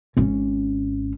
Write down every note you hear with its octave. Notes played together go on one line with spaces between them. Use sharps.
G#1 C#4